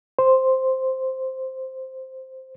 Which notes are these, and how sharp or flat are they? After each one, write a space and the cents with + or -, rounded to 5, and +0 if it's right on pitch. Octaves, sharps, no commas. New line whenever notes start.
C5 +0